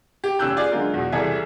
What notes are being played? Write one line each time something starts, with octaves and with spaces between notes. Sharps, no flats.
G4
F1 C#4 G4 E6 F#6 G6
F4 G#4 D5
D3 F#3 G#3 F4 A#4
E2 B2
C2 C3 E3 G#4 A4 E5